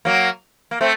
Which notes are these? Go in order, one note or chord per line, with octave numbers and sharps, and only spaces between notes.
F#3 A#3
A#3
A3 C4